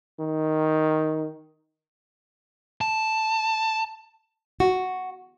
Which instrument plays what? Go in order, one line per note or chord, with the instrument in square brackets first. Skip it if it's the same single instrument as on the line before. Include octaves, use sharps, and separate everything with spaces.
[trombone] D#3
[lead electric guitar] A5
[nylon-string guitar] F#4